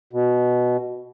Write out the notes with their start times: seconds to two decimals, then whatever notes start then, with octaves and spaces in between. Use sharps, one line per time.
0.13 B2